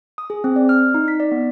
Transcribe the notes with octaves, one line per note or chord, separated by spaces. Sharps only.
D#6
G#4
C4
D5
F6
D#4
B6
D5
B3